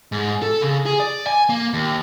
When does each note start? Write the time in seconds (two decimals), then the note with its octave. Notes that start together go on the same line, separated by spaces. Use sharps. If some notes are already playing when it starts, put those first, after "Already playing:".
0.12 G#2
0.42 A4
0.62 C#3
0.86 G#4
1.00 D5
1.27 G#5
1.49 A#3
1.73 D#2